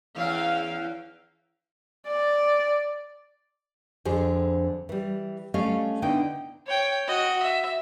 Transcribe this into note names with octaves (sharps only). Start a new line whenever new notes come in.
E2 C#4 F5
D5
F2 D3 G#4 C5
E3 G3
G3 A3 C#4 D#5 F5
D3 B3 D#4 E4 G5
C#5 G5
F#4 D#5
E5